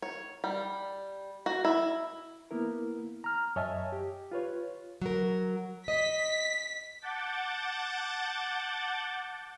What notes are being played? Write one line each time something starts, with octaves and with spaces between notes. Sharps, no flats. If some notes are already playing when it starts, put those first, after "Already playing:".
C#5
G3
F#4
E4
A#3 B3 E4 A#4
A#5 F6
F#2 C#5 D#5 E5 G#5 A5
G4
F4 B4 C#5
F#3 A#4
D#5 B6
F#5 A5 D6 G6 A6